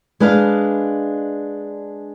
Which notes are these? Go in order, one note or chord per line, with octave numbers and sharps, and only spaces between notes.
G#3 D4 B4 D#5 F5